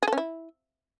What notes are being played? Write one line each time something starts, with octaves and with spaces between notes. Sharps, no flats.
G#4
A4
C#4
E4